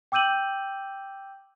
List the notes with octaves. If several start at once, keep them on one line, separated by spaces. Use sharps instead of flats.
G5 D6 E6 G6 D#7 F#7